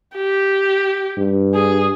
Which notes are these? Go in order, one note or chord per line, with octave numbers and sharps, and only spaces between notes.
G4
G2
G#4